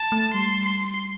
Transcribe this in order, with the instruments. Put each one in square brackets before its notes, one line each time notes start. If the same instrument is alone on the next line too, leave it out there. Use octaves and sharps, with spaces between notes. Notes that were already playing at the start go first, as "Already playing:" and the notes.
Already playing: [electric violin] A5
[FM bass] A3
[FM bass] G3 [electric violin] C6
[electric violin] C6